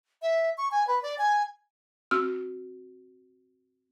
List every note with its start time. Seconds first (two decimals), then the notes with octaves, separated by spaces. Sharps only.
0.22 E5
0.58 C#6
0.72 G#5
0.87 B4
1.03 D5
1.18 G#5
2.11 C4 F#4 E6 F6